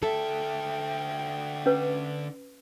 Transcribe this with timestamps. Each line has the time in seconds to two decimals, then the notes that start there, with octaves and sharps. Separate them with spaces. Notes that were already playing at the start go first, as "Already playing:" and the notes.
0.03 D3 A4 E5 G5
1.66 C#4 B4